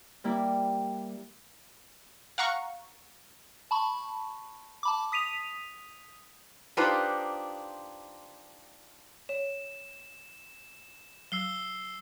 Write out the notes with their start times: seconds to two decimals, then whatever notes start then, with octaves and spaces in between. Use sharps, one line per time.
0.24 G3 A#3 E4
2.38 F5 F#5 A#5 C#6
3.71 A5 B5 C#6
4.83 A5 B5 D6
5.12 D#6 B6 D#7 F7
6.77 D4 D#4 F4 G4 B4 C5
9.29 C#5 E7
11.32 F#3 E6 C7 G7